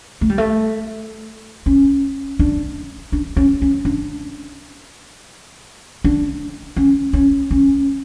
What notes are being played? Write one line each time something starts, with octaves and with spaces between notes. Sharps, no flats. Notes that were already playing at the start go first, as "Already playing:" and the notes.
A3
G3
A3
C#4
D4
D4
C#4
C#4
D4
D4
C#4
C#4
C#4